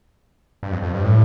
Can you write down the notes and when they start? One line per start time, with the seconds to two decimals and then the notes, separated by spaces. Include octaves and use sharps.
0.63 G2
0.72 F2
0.82 F2
0.94 G2
1.04 A2